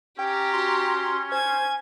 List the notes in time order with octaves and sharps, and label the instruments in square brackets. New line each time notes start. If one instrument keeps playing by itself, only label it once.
[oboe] C#4 [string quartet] G4 A#5 [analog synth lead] G5
[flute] F#4 [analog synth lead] C6
[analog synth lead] C5 [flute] G#5 [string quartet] G#6